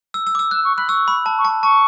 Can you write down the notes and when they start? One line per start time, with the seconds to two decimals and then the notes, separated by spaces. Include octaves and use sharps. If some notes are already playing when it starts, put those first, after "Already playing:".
0.14 E6
0.27 E6
0.35 D6
0.39 E6
0.51 E6 F#6
0.64 C#6
0.77 B5 F#6
0.89 C#6 E6
1.08 B5
1.26 A5
1.38 C#6
1.45 A5
1.63 A5 C#6